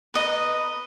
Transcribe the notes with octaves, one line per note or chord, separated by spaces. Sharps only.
B4 D#5 A#5